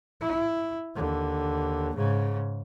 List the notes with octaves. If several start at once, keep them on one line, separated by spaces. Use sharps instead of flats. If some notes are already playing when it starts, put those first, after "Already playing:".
E4
D#2 D3
G#2 C#3